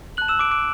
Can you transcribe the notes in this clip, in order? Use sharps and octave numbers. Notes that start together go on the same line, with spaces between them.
F#6 F#7
A5
E6 E7
D6 D7
D6 D7